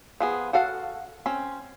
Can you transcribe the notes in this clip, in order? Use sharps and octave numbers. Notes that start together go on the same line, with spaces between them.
F3 B3 G#4
F#4 A4 F5 F#5
C4 C#4